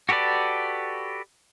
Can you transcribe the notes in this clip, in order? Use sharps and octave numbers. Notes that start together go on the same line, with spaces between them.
F#4 G4 A4 B4 D5